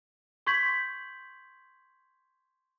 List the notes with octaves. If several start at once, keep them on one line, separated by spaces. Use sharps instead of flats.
C6 C#6 G6 G#6 B6 F#7